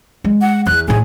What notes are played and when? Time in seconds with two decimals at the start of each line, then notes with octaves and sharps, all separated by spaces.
0.24 G#3
0.41 F#5
0.66 E2 F#6
0.88 A2 A3 G#4